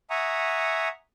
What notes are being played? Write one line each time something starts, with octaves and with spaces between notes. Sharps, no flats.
E5 F#5 G#5 A#5 C#6 D#6